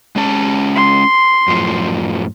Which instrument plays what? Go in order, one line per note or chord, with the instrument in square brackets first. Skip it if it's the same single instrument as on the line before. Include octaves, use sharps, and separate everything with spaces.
[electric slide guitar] G#3 C#4 A5
[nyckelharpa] C6
[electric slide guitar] F#2 A2 F3